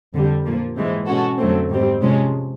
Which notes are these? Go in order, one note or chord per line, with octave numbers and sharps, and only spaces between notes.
F2 D3 G3
A#2 F3 A#3
G#2 E3 G#3 C4
B2 G#3 C#4 F#4 A4
F2 D3 F#3 A3 C4
G#2 D#3 G3 C4
C3 F3 G#3 C#4